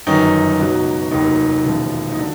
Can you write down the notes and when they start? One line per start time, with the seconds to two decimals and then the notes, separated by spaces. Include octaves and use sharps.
0.07 G1 F#2 D#3 F#3 D#4
0.59 C#2 B2 F#3
1.11 F1 D#2 D#3 F#3 D#4
1.65 E1 D#2 C#3 F3
2.12 D#4
2.16 D3 F#3 E4